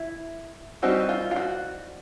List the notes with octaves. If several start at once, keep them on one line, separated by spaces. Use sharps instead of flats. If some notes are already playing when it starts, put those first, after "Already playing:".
Already playing: E4
E3 G3 C4 D#4 F#4
F4
F4
F#4